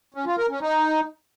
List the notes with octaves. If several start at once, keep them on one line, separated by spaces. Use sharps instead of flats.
C#4
F4
A#4
C#4
D#4